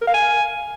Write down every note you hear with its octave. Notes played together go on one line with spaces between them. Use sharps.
A#4
F5
G#5